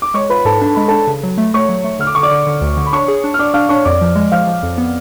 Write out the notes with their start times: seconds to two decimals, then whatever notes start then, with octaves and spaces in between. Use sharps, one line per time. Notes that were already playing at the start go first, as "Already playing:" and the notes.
0.02 D6
0.14 G#3 C#5 C#6
0.30 F4 B4 B5
0.45 G#2 A4 A5
0.61 D4 A5
0.75 G#3 B5
0.88 D4 A4 A5
1.07 C#3
1.23 F#3
1.38 A3
1.54 A3 C#5 C#6
1.69 F#3
1.84 A3
1.99 D3 F6
2.07 D6
2.15 D3 C#6
2.23 D5 D6
2.31 D3
2.47 D3
2.61 D2
2.77 D3
2.86 B5
2.92 D4 C#5 C#6
3.08 G#4
3.24 D4
3.34 F6
3.39 D4 D5 D6
3.54 D4 F5 F6
3.69 D4 C#5 C#6
3.85 F2 D5 D6
4.01 F3
4.16 G#3
4.32 F3 F5 F6
4.47 F3
4.63 F2
4.78 B3